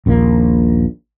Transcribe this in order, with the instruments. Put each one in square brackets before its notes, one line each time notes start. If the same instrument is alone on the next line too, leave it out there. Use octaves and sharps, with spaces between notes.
[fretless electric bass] D#1 A#1 D#2 A#3